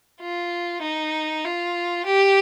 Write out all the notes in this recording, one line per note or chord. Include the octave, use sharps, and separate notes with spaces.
F4
D#4
F4
G4